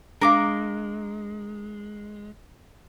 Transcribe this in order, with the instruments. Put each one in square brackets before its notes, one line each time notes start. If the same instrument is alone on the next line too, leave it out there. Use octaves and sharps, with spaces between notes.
[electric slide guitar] G#3 [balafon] D4 F5 [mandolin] A#4 D6